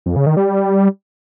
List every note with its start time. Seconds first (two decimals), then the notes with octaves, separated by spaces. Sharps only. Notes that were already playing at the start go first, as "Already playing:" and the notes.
0.06 F2
0.16 C#3
0.26 D#3
0.37 G3